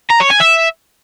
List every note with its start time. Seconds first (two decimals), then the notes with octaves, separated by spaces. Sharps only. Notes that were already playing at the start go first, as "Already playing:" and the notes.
0.11 A#5
0.21 C#5
0.31 G#5
0.41 E5